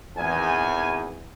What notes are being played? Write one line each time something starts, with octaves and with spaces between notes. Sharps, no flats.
G#1 E2 G#5